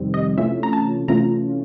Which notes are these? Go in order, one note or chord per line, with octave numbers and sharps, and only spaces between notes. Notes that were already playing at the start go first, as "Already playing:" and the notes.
Already playing: F2 C3 D#3 G3 C4
D#5
C3 E3 A3 C#4 F4 E5
A#5
A5
C3 E3 A3 C#4 F4 A#5